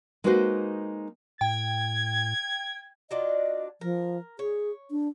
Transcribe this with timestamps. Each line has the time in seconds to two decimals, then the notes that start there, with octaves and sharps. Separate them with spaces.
0.24 G#3 A#3 D#4 F#4 B4 C5
1.41 A2 G5 G#6
3.11 F#3 D4 F4 D#5
3.81 F3 A#4
4.39 G#4 C#5
4.91 D4